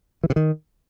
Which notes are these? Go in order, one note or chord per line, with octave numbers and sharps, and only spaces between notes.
E3
C3
D#3